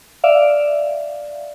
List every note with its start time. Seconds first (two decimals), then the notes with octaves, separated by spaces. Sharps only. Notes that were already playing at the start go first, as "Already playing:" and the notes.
0.24 D5 E5 F5